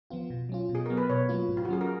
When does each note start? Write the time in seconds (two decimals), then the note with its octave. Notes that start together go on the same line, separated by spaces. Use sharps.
0.10 F3 B3 F4
0.30 B2
0.49 F#3 C#4 F4
0.69 B2
0.75 G#4
0.86 F#3 B3 A#4
0.97 B4
1.10 B2 C#5
1.29 F#3 A#3 C#4 F4
1.48 G#2
1.57 F4
1.65 F#4
1.69 F#3 C#4 G#4
1.81 A#4